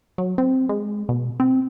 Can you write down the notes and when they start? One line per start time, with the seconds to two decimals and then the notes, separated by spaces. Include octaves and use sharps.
0.18 F#3
0.38 C4
0.69 G#3
1.09 B2
1.40 C4